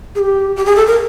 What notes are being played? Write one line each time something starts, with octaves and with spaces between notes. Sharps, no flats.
G#4
G4
G4
G#4
A4
A#4